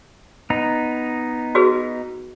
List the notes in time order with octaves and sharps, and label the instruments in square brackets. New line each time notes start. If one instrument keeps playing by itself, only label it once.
[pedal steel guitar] B3 D#4 A#5
[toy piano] F#4 G#4 B4